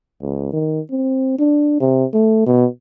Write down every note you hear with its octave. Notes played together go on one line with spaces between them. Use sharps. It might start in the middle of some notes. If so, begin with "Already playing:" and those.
C#2
D#3
C4
D4
C3
A3
B2